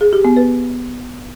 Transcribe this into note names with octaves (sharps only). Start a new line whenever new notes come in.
G#4
G4
B3
B4